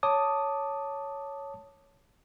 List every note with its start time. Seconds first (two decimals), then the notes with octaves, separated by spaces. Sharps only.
0.03 C#5 A5 D6 D#6